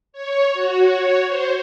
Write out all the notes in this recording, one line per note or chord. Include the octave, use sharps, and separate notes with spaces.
C#5
F#4
C#5
C5